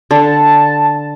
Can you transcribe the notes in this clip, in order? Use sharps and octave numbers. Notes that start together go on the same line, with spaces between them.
D3 A5